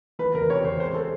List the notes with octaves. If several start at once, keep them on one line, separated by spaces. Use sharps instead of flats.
E3 B4
E2 A#4
C3 C#5
E2 C5
G#3 C5
A4